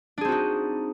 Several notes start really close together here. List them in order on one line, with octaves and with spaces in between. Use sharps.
D4 G#4 C4 F#4 D#4